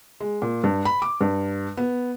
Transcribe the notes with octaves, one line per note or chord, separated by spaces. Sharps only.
G#3
A#2
G2
B5
D6
G2
B3